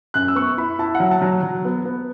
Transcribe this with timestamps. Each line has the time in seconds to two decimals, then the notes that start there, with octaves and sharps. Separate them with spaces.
0.14 F#2 F#6
0.28 E6
0.35 B3 C#6
0.57 E4 B5
0.79 E4 A5
0.95 F#5
1.00 F#3
1.11 A5
1.22 F#3
1.43 F#3
1.65 B3
1.85 B3